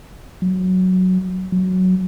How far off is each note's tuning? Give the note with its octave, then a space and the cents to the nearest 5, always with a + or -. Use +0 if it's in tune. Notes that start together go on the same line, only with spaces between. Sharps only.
F#3 +0
F#3 +0